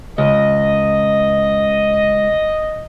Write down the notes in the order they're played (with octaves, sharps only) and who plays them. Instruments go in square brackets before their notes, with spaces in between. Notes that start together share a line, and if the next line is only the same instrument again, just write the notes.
[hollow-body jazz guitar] C#2 [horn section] D#5